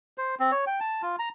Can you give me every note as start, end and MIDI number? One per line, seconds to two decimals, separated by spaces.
0.18 0.35 72
0.39 0.51 60
0.52 0.65 73
0.67 0.80 79
0.80 1.02 81
1.02 1.16 65
1.19 1.29 82